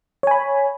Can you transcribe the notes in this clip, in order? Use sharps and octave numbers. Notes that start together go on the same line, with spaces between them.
C#5 G#5 B5